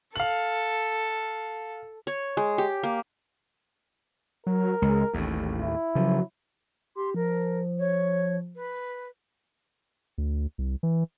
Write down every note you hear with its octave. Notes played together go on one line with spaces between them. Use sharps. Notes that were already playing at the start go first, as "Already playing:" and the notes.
A4 F5 F#7
C#5
G#3
G4
A#3
F#3 A#4
C#2 G#3
A1 D#2 A2
E4
C#3 F3 F#3
G4 C6
F3 A#4
C#5
B4
D2
C2
E3